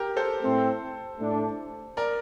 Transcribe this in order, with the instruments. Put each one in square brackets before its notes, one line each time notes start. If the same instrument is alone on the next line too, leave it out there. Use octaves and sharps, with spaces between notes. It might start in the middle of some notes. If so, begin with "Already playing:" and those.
Already playing: [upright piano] G4 A#4
A4 C5
[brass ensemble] A2 A3 C4
A2 A3 D4
[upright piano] A#4 D5